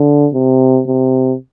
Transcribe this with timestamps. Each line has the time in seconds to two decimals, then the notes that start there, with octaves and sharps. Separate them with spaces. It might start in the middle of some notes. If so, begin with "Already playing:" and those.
Already playing: D3
0.34 C3
0.87 C3